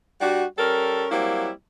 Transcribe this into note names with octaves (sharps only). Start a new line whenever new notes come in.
G3 D4 F#4
G3 C#4 A4 A#4
F#3 G3 A#3 C4 E4